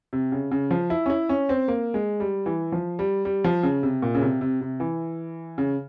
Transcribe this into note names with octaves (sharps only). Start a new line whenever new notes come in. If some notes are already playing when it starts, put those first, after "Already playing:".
C3
C#3
C#3
F3
E4
C#4
E4
C#4
C4
A#3
G#3
G3
E3
F3
G3
G3
F3
C#3
C3
A#2
C#3
C3
C3
C3
E3
C#3